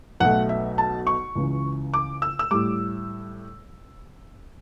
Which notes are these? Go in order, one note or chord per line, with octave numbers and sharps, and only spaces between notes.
B1 B2 A3 F#5
E5
A5
C#6
C#2 C#3 E3
D6
E6
E6
A2 G3 D6